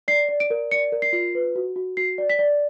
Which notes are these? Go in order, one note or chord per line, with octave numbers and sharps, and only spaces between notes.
D5 C7
D5
D7
A#4
D5 C#7
A#4
C7
F4
B4
F#4
F#4
F#4 C7
D5
B6
D5